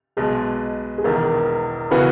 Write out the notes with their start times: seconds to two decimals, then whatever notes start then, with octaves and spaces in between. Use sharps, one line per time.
0.17 B1 B2 G#3 G#4
0.98 G#4
1.04 E1 E2 D#3 A#4
1.91 C#3 E3 B3 F#4 B4